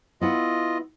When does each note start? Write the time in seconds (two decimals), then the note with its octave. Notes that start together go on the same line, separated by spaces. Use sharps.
0.21 B3 E4 F4 D#5 F#5